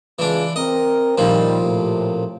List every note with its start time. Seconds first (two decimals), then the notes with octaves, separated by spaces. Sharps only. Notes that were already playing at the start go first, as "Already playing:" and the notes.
0.19 C#3 E3 G#3 D4 F4
0.56 C4 A#4 D#5
1.18 A#2 D#3 F3 G3
1.62 A2 C3